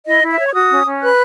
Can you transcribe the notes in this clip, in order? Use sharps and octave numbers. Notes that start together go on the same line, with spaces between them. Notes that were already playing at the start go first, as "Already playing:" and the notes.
E4 D#5
E4
E5
C#5
C#6
F#4 D#6
C#4
C#4
B4 F#6